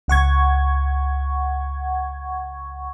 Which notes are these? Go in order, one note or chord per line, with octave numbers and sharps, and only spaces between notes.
C#2 F#5 C#6 G#6